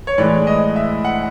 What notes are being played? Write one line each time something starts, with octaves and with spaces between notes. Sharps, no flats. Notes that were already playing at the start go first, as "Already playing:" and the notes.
C#5
A2 E3 G#3 D5
D#5
E5
F#5